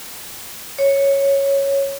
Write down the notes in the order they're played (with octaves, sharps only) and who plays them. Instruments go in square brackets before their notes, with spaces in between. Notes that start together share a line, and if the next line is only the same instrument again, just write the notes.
[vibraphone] C#5